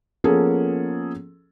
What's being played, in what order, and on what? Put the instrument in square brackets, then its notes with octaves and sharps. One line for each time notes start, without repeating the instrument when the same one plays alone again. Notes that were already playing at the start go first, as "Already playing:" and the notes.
[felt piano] F3 A#3 B3 C#4 G#4 A4